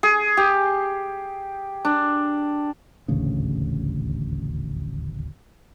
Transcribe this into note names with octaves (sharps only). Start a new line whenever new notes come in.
G#4
G4
D4
D#1 A1 D2 C#3